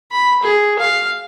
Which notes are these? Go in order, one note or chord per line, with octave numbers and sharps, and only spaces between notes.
B5
G#4
F5